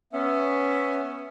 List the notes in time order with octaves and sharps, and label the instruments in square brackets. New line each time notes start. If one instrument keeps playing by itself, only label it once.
[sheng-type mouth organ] B3 [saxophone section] C#4 [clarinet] E5